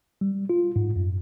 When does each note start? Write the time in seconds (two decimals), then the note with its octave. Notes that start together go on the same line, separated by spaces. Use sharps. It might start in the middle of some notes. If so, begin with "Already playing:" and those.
0.21 G3
0.50 F4
0.76 G#2
0.96 F#2